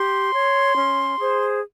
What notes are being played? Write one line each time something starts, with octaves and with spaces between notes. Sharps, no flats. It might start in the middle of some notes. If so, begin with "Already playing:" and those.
Already playing: G4 C6
C#5
C#4
G#4 C5